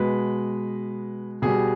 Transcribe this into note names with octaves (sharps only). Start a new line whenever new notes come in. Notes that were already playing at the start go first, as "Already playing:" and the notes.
Already playing: B2 G#3 B4
B2 G3 G#4